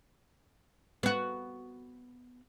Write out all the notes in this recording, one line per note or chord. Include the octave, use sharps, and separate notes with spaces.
B3 F#4